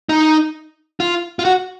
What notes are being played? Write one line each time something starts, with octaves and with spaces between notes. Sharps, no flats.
D#4
F4
F4
F#4